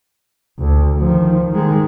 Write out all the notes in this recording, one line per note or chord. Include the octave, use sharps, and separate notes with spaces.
D2
D#3 F3
D#3 G#3